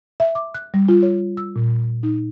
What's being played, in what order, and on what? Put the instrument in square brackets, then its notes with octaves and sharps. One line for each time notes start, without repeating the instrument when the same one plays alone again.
[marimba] E5
D6
F#6
G3
F4
C#5
E6
A#2
D#4